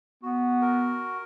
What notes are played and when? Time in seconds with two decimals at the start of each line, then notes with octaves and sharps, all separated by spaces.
0.23 B3 F#4
0.62 A#4